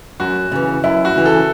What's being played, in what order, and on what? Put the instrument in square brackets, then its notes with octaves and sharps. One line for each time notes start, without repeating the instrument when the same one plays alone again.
[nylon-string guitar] F#2 [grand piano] F#4
[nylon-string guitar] C#3 E3
[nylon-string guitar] F#2 [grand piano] E4
[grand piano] F#4
[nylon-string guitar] C#3 E3
[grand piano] A4